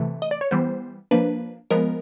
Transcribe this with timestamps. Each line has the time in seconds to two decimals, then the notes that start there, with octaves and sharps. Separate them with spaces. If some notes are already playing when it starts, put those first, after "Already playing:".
Already playing: C3 E3 A3
0.22 D#5
0.31 D5
0.41 C#5
0.51 E3 G3 B3 C5
1.11 F3 A#3 D4 B4
1.71 F3 G#3 B3 A#4